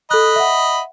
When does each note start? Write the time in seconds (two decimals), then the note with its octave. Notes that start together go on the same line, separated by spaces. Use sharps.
0.11 A4 D#5 B5 F#6
0.36 E5 F#5